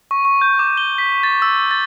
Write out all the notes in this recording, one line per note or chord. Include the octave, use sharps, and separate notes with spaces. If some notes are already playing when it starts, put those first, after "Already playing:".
C#6
C#6
G6
D6
G7
B6
A6
E6
A6